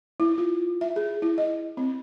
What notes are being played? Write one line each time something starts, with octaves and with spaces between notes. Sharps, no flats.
E4
F4
E5
G#4
E4
D#5
C4